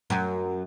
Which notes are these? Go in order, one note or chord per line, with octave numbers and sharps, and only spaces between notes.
F#2